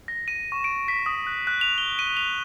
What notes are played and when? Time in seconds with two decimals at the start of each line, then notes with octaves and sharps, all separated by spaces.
0.08 A#6
0.28 D#7
0.52 C#6
0.64 D7
0.88 B6
1.06 D#6
1.27 F#6
1.47 F#6
1.61 F7
1.78 G7
1.99 D#7
2.17 F7